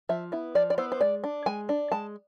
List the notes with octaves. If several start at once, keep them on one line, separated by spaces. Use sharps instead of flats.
F3 E5
B3 E4
F3 D5
D5
B3 E4 C5
C5
G#3 D5
D4
G#3 G#5
D4
G#3 A5